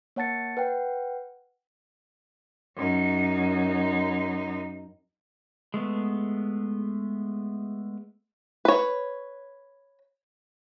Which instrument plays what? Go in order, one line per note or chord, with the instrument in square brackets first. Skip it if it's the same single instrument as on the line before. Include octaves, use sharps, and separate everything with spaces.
[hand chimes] A#3 C#5 F#5 A5 A6 C#7
B4 F#5 G5
[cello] F#2 D#4
[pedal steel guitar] G#3 A3 B3
[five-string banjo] B4 C#5